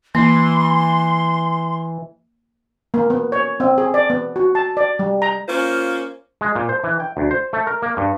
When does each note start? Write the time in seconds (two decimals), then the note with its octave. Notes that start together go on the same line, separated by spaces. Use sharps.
0.15 E3 A#3 C6
2.94 A#3
3.10 B3
3.32 C#5
3.60 C4
3.78 G#4
3.94 D5
4.10 B3
4.36 F#4
4.55 A5
4.77 D5
4.99 G3
5.22 A#5
5.49 A#3 C#4 F4 C5
6.41 G#3
6.55 A#2
6.69 C5
6.84 E3
7.00 G5
7.17 D2
7.31 C5
7.53 A3
7.67 A#4
7.82 A#3
7.97 G2